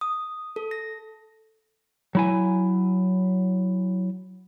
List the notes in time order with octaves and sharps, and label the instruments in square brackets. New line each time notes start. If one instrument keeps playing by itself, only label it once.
[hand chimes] D#6
A4
A#6
[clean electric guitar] F#3 E4 G#5